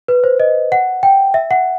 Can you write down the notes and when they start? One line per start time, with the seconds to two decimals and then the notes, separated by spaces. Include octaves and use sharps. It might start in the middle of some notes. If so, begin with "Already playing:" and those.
0.08 B4
0.24 C5
0.40 D#5
0.72 F#5
1.03 G5
1.34 E5
1.51 F#5